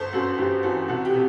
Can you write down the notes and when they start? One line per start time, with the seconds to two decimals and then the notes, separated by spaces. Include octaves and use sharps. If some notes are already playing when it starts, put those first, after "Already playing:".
Already playing: G1 A4 C5
0.13 F#2 F#4 A4
0.38 G1 G4
0.63 E3 F#4 A4
0.88 C2 F#4 A4
1.05 G4
1.13 C3